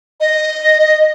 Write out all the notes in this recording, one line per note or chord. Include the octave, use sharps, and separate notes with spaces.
D#5